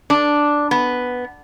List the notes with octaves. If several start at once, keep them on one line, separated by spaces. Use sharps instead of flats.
D4
B3